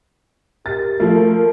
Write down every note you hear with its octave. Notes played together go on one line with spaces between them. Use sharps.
G4 A#4 A6
F3 A3 A#3